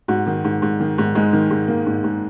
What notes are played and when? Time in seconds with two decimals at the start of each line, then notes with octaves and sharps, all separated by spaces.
0.08 G#2 F#4
0.27 D#3
0.44 G#2
0.62 G#2
0.80 D#3
0.98 G#2
1.15 G#2 G#3
1.33 D#3
1.50 G#2
1.68 D#3 A#3
1.86 G#2
2.04 G#2